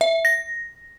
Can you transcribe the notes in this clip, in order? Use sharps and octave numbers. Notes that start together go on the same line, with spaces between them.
E5
A#6